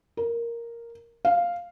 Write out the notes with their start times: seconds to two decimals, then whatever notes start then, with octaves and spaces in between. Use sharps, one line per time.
0.17 A#4
1.25 F5